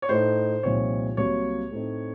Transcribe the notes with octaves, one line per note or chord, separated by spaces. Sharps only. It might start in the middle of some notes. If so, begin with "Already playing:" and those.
C#5
A2 A3 D#4 C5
C2 A#2 F3 C4 D#4 C#5
C2 C3 F#3 A#3 C#5
A2 A3 C4 D#4